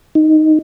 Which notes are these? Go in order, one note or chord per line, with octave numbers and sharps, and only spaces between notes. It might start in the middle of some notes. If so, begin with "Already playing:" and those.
D#4